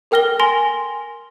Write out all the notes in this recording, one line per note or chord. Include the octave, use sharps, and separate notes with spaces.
A4 A#4 G5 F6 A#6 G7
G#5 C6 A#6 G7